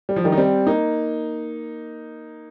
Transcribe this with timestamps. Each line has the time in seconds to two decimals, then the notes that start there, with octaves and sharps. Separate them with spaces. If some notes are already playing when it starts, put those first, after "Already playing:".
0.09 G3
0.16 F3
0.24 D#3 G3
0.32 D#4
0.37 G3 C4
0.67 A#3 D#4